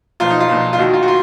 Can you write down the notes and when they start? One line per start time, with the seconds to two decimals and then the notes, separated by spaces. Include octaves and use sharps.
0.20 B1 A#2 F3 F4
0.30 D#4
0.40 F4
0.49 B1 A#2 F3
0.73 F4
0.78 D#2 D#3 F#4
0.93 F4
1.03 F#4
1.08 F4